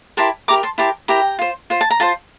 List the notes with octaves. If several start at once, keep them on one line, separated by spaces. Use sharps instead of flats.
E4 G4 A#4 A5 C6
E4 G4 A#4 A#5 D6
A5 C6
E4 G4 A#4 A5 C6
E4 G4 A#4 G5 A#5
F4 C5
F4 C5
A5
A#5
F4 C5 A5 C6